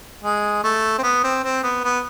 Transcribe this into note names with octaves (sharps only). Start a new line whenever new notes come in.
G#3
A3
C4
B3
C4
C4
B3
B3